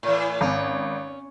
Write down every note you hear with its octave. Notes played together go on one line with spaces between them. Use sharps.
A2 E3
G#1 C#4